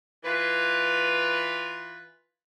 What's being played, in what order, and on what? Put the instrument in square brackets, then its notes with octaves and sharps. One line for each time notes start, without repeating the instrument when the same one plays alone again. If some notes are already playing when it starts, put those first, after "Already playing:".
[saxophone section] E3 F4 B4